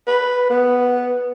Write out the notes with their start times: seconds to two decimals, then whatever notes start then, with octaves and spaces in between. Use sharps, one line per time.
0.07 B4
0.50 B3